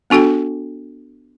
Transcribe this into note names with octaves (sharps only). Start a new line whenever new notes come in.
B3 D4 F#4 A4 G5